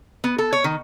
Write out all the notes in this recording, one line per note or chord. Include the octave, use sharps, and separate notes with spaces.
B3
A4
C#5
D#3